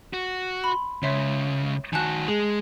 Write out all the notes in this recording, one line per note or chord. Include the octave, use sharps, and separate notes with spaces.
F#4
B5 C6
C#2 C#3 C#5 E5 C6
D#3 F#4 G#5 A5 F#6
G#3 G#4